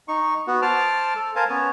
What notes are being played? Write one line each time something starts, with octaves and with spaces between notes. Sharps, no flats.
D#4 C#6
B3 F#4
C5 A5 D6 F6
A4
A#4 C5 F5 G#5 A5
B3 C#4 C#5